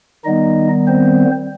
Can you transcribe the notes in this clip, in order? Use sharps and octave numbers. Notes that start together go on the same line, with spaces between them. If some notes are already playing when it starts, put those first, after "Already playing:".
D#3 G3 B3 D#4 D#5
C4 C5